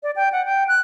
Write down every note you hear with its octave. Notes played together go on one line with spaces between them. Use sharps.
D5
G5
F#5
G5
F#6